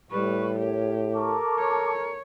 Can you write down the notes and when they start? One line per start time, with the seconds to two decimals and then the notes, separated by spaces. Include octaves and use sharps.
0.11 A2 G3 B4 C#6
0.59 G4 A#4 C#5
1.14 A4 A#4 A5 C#6 D6
1.58 C#5